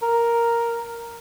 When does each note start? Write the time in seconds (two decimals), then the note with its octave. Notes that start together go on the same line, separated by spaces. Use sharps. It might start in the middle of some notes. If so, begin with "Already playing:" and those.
0.02 A#4